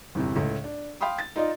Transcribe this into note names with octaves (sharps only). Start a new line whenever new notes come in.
G1 E2 C3
C#2 A2
D4
F5 G5 B5 C6 D#6
A6
D#4 F4 D5 D#5